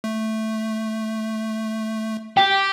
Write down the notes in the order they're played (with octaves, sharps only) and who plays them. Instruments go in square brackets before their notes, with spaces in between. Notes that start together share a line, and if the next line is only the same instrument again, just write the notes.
[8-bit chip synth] A3
[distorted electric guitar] G4 [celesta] G5